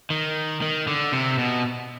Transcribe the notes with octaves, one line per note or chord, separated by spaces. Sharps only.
D#3
D#3
D3
C3
B2